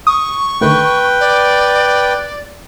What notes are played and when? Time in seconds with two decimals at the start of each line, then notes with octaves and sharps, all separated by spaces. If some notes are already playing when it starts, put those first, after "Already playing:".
0.07 C#6 D#6
0.61 D3 D#3 A3 B4 G5
1.20 D5